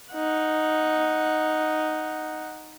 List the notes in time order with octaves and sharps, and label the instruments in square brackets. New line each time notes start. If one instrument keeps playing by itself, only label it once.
[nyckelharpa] D#4 F#5